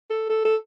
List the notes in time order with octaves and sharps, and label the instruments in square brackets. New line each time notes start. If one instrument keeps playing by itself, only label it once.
[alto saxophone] A4
A4
A4